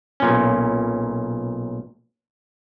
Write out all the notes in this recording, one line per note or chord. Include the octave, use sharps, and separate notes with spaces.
B1 A#2 C#4